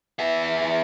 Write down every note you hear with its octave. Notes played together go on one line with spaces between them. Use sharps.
B3 E5